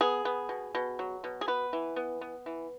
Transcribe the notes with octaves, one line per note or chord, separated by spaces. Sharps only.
B3 G#4
B3
B2
B2
F#3
B2
G#4
B3 B4
E3
B3
B3
E3